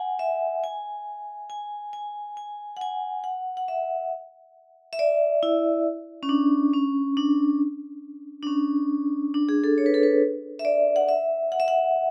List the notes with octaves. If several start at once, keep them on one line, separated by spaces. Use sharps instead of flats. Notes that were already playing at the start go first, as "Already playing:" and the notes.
Already playing: F#5 G#5
E5
G#5
G#5
G#5
G#5
F#5
G#5
F#5
F#5
E5
E5
D5
E4
C#4
D4
C#4
D4
D4
C#4
D4
G#4
A4
C#5
B4
A4
B4
E5
D5
F#5
E5
F#5
E5
F#5